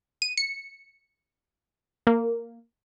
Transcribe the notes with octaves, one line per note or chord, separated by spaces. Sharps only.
D#7
C#7
A#3